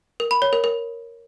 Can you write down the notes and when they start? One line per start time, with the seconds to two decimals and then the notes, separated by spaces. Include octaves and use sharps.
0.20 A#4
0.31 B5
0.42 C#5
0.53 A#4
0.64 A#4